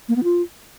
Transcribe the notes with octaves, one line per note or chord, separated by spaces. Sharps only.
A#3
B3
F4